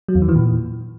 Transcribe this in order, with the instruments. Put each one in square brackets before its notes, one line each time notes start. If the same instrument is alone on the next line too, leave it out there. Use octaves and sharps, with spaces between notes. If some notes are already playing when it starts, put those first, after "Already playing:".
[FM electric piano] F#3
E2
D#3
E3
A#2